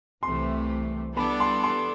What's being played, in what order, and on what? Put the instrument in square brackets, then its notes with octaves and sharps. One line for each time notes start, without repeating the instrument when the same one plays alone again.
[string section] C2 C3 E3 A3 [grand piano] C6
[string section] E3 G3 B3 D4 A4 [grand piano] B5
[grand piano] C6
C6